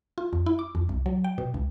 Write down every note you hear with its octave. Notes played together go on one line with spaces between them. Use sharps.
F4
F2
E4
D6
F2
C2
F#3
G5
B2
C#2